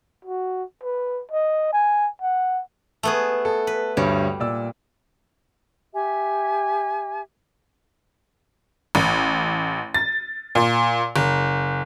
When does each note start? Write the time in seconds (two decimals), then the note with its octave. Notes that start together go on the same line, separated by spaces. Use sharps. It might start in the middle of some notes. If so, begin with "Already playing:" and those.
0.25 F#4
0.83 B4
1.31 D#5
1.73 G#5
2.21 F#5
3.03 A3 B3 G#4
3.45 A4
3.67 B4
3.97 D2 G2 G3 C#5
4.40 A#2 D5 E6
5.93 G4 E5 G#5
8.95 A1
9.94 A6
10.55 A#2
11.16 F#1